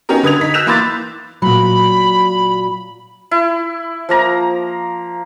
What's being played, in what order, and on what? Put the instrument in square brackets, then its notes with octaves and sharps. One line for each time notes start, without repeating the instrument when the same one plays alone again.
[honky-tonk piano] B3 C#4 D#4 G4 A#4
D3 B4 D#6 G#6 F7
D#4 B6
E6 F#6 G6 A#6 E7 F7
E3 A#3 B5 C6 D6 A6
[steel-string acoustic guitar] A#2 F#3 [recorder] B5
[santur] E4
F3 A#3 A#5